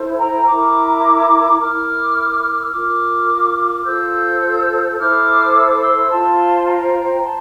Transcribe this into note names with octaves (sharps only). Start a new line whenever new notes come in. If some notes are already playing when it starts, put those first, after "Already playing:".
Already playing: E4 A4 C5
G5 A#5
E4 A#4 A#5 D6
E4 A#4 D6 F6
E6
F4 A#4 D6 F6
F4 A4 C5 E6 G6
E4 A4 C5 D6 F6
E6
D6
C6 E6
F4 C5 A5 C6
G5 A#5
C5 A5 C6